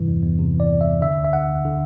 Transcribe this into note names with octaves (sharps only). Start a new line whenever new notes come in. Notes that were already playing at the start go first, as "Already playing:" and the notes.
Already playing: G2 C3 E3
E2
E2
C3
E3
D5
E2
E5
E2
D3 E5
D2
E5
D3 F#5
D2
D3